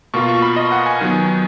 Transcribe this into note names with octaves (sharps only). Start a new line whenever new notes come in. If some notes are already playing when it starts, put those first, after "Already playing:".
B2 A#3 F4 C#6
C#6
B5
D#5
F#5
G#5
D#3 F#3 B3